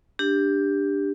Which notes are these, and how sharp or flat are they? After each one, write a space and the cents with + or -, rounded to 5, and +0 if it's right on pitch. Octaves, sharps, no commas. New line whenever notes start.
D4 +0 G4 +10